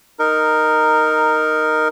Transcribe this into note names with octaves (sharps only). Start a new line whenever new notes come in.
D#4 A#4